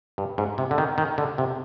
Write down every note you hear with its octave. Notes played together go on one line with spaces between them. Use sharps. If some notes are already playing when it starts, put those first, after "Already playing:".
G2
G#2
C3
D3
D#3
D#3
D3
C3